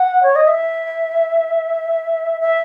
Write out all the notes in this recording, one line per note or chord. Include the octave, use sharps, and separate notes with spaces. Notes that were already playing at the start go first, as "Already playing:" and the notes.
Already playing: F#5
C#5
D#5
E5
E5